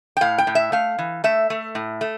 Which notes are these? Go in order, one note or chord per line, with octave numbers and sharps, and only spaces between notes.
G5
A2 F5
G5
A2
E5
A3 F5
E3
A3 E5
A3
A2
A3